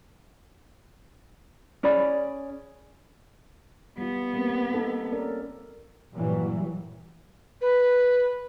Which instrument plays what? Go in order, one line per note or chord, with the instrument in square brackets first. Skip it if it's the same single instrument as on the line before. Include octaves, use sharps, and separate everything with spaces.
[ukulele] C#4 G#4 D5 B5
[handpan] G3 F4 [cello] B3
[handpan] G3 A#3 C4
D#4 A4 A#4
C#4 A#4 D5
[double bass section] G2 A#2 E3 F#3 G3
[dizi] B4